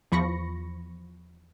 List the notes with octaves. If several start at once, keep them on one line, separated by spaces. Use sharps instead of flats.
E2 F3 B5 C#6 A#6 C#7